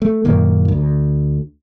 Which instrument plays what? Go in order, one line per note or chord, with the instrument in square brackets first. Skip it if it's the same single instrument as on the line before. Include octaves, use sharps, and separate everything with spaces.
[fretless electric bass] A3
F#2 A#2 D#3 A#3
D2